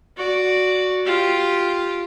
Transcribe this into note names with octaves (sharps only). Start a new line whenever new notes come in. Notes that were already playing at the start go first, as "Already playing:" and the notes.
F#4 D5
F4 G4